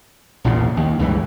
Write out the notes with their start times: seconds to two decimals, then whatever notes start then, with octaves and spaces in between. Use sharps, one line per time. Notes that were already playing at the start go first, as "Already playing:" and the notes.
0.44 A#1 E2 A#2 C#3
0.77 D#2
0.99 C#2 G2 C#3 E3